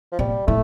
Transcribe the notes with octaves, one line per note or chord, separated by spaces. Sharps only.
F3
A#2 G3
A2 A3